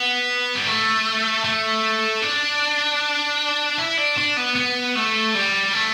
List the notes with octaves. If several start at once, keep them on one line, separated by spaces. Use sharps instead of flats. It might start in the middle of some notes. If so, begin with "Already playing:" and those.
Already playing: B3
G3
A3
A3
D4
E4
D4
D4
B3
B3
A3
G3
A3